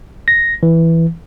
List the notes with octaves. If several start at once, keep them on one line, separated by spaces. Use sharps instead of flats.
A#6
E3